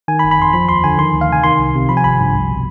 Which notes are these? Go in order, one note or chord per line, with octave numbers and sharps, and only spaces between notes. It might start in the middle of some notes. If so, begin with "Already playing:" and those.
D#3 G#5
B5
G1
B5
F2 C6
F3 B5
D#2 C6
D3 G#5
D#3 C6
D2
F5
C3 G#5
D#3 C6
C2
C3
F3 B5
G#5
G#1 B5
G2
C2
B2